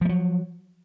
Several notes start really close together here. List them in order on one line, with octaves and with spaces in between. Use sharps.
F3 A3 F#3